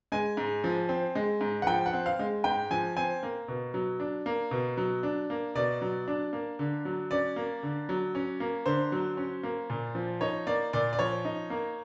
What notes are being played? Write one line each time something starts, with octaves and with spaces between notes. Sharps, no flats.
G#3 G#5
G#2
F3
C4
G#3
G#2
F#5
F3 G5
F#5
C4
F5
G#3
G#2 G5
F3 G#5
C4 G#5
A#3
B2
F#3
D4
A#3
B2
F#3
D4
A#3
B2 D5
F#3
D4
A#3
D3
F#3
C#4 D5
A#3
D3
F#3
C#4
A#3
D3 C5
F#3
C#4
A#3
A#2
F3
D#4 C#5
A#3 D5
A#2 D5
D5
F3 C#5
D#4
A#3